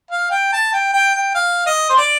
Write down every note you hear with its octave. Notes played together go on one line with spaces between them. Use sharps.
F5
G5
A5
G5
G5
G5
F5
D#5
C5
D5